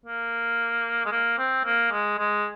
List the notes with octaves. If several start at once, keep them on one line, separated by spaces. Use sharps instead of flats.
A#3
G#3
A#3
C4
A#3
G#3
G#3